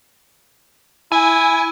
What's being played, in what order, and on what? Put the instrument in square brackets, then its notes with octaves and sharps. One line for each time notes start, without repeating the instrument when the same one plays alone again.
[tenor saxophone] E4 [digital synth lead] G#5